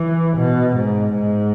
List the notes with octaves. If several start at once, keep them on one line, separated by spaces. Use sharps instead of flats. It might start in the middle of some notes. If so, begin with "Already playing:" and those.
Already playing: E3
B2
G#2
G#2